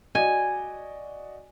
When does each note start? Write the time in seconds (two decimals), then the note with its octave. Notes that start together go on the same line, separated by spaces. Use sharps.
0.15 F#4 D5 D#5 G#5